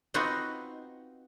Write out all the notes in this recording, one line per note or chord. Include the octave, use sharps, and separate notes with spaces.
B3 C4 D#4 F4 F#4 D#5